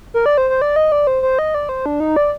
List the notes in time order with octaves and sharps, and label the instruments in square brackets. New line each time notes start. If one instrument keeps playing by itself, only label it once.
[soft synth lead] A#4
D5
C5
C5
D5
D#5
D5
C5
C5
D#5
D5
C5
D4
D#4
D5